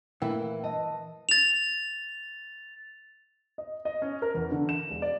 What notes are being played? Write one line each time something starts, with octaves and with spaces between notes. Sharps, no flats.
A#2 E3 A3 E4 A#4 F5 G5
D#5 A5
A6 F7
D#5
D#5
C#4
A#4
E2
D3
E7
E1
D5